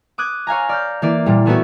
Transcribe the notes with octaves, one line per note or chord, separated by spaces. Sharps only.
D6 D#6 F#6 G#6
C#5 F5 G#5 A#5
D5 F6 G6
E3 A#3 D5
A#2 G3
E3 A3 B3 C#4 E4 F#4